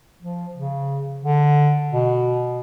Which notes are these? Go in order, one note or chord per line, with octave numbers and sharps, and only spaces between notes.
F3
C#3
D3
B2